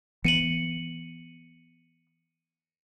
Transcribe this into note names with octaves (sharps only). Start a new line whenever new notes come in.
E3 B3 C#7 D#7 F#7